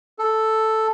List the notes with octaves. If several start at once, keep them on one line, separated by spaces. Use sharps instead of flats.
A4